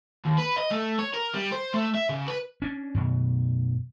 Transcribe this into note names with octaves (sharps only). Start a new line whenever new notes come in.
D#2
B4
D#5
A3
C#5
A#4
G3
C5
A3
E5
C#3
B4
C#4 D4
F#2 B2